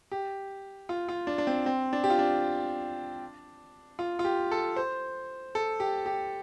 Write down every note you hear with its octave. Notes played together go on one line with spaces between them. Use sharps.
G4
F4
F4
D4
D4
C4
C4
D4
G4
F4
D4
F4
F4
G4
A4
C5
A4
G4
G4